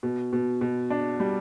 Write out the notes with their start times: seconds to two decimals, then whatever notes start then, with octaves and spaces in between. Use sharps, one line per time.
0.03 B2
0.33 B2
0.61 B2
0.90 D4
1.20 G3